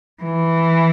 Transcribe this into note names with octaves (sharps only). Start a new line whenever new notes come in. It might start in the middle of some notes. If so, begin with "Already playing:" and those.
E3